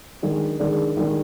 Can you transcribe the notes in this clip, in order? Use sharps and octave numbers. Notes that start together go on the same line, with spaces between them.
D#3 G#3 D4 G#4
D#3 G#3 D4 G#4
D#3 G#3 D4 G#4